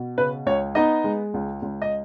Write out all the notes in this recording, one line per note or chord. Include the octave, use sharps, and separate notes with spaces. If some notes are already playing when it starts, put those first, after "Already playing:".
Already playing: B2
C#3 B4
C#2 C#5
B3 D#4 D#5
G#3
C#2
C#2
D#5